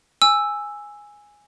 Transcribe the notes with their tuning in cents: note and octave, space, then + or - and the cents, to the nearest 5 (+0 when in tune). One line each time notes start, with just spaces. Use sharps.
G#5 -5 E6 +0